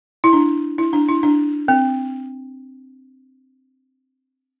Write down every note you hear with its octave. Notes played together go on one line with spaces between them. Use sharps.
E4
D4
E4
D4
E4
D4
C4